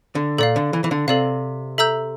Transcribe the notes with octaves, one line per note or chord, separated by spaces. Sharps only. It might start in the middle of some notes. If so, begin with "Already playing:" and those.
D3
A#2 A4 D5 F5
D3
E3
E3
D3
C3 A4 D5 F5
A4 E5 A#5 E6 G6